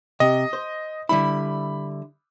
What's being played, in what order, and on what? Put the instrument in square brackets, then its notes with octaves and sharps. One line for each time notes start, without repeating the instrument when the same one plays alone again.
[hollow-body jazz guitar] C3 [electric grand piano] D#5
[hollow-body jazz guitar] C5
[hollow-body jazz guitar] D3 G3 E4 [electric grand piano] B5